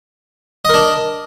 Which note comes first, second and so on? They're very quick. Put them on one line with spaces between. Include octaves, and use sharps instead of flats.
D#5 A#4 D4